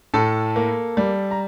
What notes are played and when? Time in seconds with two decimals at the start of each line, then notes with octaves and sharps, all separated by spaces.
0.14 A2 A4 A5
0.56 A#3
0.97 G3
1.31 A#5